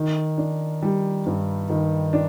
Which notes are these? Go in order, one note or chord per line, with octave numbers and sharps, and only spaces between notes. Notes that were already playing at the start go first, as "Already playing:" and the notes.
Already playing: D#3
D4
G3
G2
D#3
D4